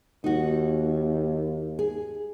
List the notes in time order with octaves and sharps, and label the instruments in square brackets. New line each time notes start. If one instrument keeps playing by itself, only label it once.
[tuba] D#2 [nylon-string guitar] D#4 F#4
[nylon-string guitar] G#4